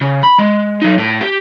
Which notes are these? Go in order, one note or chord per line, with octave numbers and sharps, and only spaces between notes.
C#3
B5
G#3
F#3 D#4
A2
G4